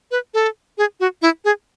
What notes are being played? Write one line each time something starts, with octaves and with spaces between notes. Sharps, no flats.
B4
A4
G#4
F#4
E4
G#4